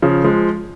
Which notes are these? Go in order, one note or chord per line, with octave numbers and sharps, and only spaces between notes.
C#3 F3
F3 G#3